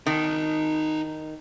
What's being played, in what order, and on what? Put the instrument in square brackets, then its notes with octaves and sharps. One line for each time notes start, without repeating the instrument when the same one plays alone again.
[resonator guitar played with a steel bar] D#3 [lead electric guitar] D#4 A5